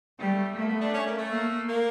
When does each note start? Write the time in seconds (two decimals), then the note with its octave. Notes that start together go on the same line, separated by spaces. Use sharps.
0.20 G3 A3
0.56 A3 A#3
0.69 B3
0.82 D4
0.94 C#4
1.07 A#3
1.18 A3
1.31 A#3
1.68 A#3